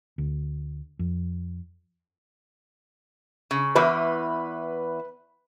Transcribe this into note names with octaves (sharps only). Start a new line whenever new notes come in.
D2
F2
C#3
E2 E3 B4